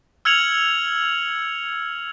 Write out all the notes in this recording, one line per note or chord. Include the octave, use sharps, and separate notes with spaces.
E6 F6 G#6 C#7 F7 F#7